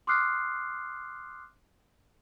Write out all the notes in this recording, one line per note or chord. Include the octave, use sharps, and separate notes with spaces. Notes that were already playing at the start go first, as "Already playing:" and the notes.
C6 D6 D#6 F6 F#6 C7